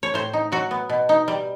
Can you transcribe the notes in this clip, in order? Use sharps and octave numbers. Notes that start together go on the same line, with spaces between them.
C#5
A2 C5
D#4
F#3 F#4
B3
B2
D#4
G3